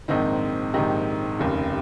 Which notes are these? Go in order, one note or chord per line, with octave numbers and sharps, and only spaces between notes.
A#1 G#2 D#3 C4 D#4
A#1 G#2 D#3 D#4 G4
F1 D#2 C#3